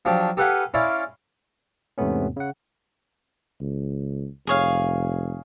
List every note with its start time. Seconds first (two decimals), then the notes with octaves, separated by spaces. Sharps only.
0.05 F3 F#3 D4 G4
0.37 G4 A4 B4 F5 F#5 G#5
0.74 C#4 E4 D5 F5 C6
1.98 E2 G#2 C3 A3 B3 C#4
2.36 C#3 F#5
3.61 C#2
4.47 F1 G#4 C#5 F5